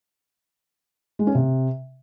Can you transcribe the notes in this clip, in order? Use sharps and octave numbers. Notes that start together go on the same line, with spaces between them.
G#3
C#4
C3